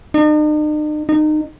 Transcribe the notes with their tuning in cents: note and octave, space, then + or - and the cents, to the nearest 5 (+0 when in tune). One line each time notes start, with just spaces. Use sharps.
D#4 -45
D#4 -25